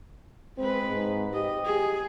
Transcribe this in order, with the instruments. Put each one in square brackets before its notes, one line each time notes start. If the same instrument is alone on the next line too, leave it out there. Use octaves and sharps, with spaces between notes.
[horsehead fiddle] G#3 B4 [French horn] C4
[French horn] G#2
[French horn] G4 [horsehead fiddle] D#5
[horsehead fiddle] G#4